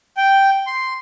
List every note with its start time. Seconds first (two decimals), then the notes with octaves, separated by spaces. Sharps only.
0.17 G5
0.67 C6